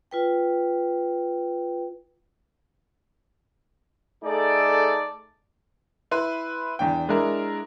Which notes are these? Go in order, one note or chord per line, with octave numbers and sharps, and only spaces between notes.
F4 B4 G5
A3 D#4 G#4 A4 D5
E4 B4 B5 C6
E2 D4 G5
G#3 D4 E4 A#4